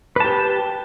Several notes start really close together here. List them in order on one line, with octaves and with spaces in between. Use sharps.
B4 A5 G4